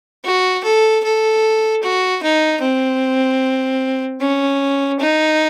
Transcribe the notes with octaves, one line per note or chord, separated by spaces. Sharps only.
F#4
A4
A4
F#4
D#4
C4
C#4
D#4